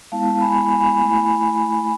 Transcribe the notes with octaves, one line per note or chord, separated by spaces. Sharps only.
G#3 B3 E4 F5 A5
G#5 B5
G#5 B5
A3 E4 G#5 B5